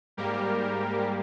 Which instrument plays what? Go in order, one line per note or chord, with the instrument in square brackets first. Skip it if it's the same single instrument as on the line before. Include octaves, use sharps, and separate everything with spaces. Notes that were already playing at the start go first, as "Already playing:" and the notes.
[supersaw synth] G#2 G3 A#3 G4 A#4